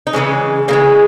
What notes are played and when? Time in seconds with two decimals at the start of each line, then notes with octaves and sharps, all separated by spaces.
0.07 D#4
0.13 C#3 E3 G#3 C#4
0.68 C#3 E3 G#3 A#3